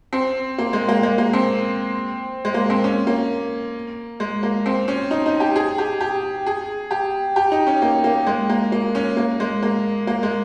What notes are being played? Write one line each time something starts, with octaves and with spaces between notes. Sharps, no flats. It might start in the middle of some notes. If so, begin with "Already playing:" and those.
C4
A#3
G#3
A#3
G#3
A#3
C4
G#3
A#3
C4
C#4
A#3
G#3
A#3
C4
C#4
D#4
D#4
G4
G#4
G4
G4
G#4
G4
G4
D#4
C#4
A#3
A#3
G#3
A#3
A#3
C#4
A#3
G#3
A#3
A#3
G#3